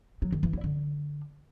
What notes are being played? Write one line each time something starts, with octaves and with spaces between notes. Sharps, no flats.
F#3
D#3
E3
E4
D3